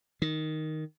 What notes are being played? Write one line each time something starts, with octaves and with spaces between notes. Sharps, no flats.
D#3